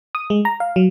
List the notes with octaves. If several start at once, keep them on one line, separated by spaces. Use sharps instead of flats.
D#6
G#3
A#5
F5
F#3